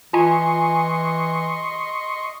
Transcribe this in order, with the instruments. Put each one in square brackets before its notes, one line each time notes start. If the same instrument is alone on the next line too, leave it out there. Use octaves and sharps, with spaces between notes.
[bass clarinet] E3 [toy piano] F4 [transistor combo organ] D#5 C6 C#6 [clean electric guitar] G#5